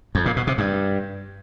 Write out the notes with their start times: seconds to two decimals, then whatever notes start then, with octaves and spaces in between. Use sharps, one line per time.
0.15 F2
0.26 A#2
0.36 B2
0.47 C3
0.58 G2